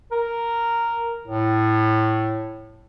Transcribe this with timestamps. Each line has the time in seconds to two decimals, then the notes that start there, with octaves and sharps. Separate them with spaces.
0.12 A#4
1.28 A2